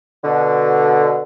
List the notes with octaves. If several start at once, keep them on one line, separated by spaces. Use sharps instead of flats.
B2 D3